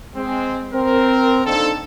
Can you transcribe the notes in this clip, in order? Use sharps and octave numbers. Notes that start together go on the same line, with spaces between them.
G#3 C4
C4 A#4
D#3 A#3 C4 D4 D#4 A4